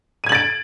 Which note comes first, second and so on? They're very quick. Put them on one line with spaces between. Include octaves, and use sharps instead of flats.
D#7 G#6 F#7 A6 D7